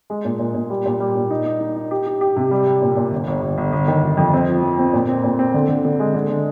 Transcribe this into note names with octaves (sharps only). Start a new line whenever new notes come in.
G#3
A#2
A#2
A#2
G3
A#2
G3
A#2
D#4
D#4
D#4
D#4
G4
G4
G4
C3
G3
G3
A#2
A#2
G1
G1
G1
G1
G1
D#3
G1
F2
C4
F3
F3
C4
A#2
C4
A#2
C4
D3
D3
D3
G#3
D3
D3